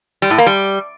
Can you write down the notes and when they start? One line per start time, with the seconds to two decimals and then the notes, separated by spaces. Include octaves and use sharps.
0.22 G3
0.30 A2
0.38 A#3
0.46 G3